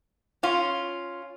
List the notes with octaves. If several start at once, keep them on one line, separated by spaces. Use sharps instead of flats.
C#4 F4